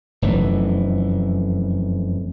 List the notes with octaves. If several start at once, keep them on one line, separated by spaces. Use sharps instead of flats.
F1 F#2 E3